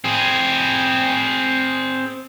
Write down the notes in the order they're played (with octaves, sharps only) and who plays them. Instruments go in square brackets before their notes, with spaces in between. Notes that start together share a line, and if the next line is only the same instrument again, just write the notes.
[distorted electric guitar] C4 G#4